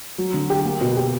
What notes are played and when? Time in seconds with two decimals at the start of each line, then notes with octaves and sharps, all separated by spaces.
0.18 F#3
0.34 D3
0.50 G4
0.65 A#3
0.81 B2
0.97 G4